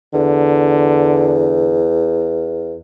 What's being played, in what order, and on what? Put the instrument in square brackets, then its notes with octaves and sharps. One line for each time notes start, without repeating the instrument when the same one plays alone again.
[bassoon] E2 [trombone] D3